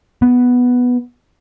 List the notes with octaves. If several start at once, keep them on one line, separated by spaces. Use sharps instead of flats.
B3